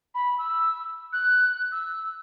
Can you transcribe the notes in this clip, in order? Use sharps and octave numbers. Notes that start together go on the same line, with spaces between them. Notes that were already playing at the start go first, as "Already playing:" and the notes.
B5
E6
F#6
E6